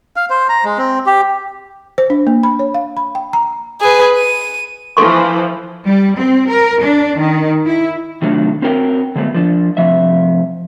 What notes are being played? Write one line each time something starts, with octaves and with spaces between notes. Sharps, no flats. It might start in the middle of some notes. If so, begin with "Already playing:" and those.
F5
C5
A#5
G#3
C4
G4
C5
D4
A#3
B5
C#5
F5
B5
G5
A#5
G#4 B4
D#7
E3 F3 A4 C6 C#6
G3
C4
A#4
D4
D#3
E4
C3 D#3 F#3 A3 D4 F4
C4 C#4 F#4 A#4 F#5 G5
D3 F#3 G#3 A3 B3
F3 D4
G2 C3 F3 E5